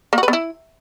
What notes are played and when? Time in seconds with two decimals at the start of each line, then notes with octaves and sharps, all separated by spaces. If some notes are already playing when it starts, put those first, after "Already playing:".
0.13 A#3
0.18 F#4
0.23 B4
0.28 B3
0.33 E4